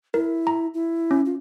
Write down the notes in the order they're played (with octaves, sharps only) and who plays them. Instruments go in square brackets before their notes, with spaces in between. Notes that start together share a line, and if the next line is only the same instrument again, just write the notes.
[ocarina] E4 [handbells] A#4
[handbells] A#5
[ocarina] E4
[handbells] C#4
[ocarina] F4